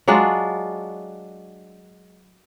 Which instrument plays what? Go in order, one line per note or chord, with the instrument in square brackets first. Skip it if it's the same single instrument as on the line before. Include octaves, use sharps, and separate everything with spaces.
[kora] F#3 G#3 D4 F4